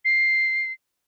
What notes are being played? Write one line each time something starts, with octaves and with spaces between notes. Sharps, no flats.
C7